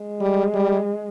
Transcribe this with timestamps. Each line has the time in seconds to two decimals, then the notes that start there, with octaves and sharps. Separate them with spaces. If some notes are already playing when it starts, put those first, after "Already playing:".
Already playing: G#3
0.21 G3
0.54 G3